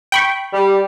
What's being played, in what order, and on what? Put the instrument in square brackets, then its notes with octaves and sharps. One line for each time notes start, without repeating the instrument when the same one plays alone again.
[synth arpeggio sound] G5 B5 C#6
[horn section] G3